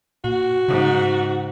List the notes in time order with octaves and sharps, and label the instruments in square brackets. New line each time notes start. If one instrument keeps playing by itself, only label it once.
[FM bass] A#2 [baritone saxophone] F#4
[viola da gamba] G#2 [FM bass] C#3